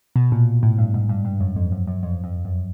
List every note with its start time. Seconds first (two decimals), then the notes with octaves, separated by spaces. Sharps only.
0.16 B2
0.32 A#2
0.63 A2
0.78 G2
0.94 G#2
1.09 G2
1.25 G2
1.41 F#2
1.56 F2
1.72 F#2
1.87 F#2
2.03 F2
2.24 F2
2.45 F#2